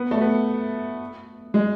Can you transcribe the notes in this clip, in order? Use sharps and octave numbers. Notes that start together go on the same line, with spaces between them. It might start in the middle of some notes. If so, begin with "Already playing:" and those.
Already playing: B3
A3
B3
G#3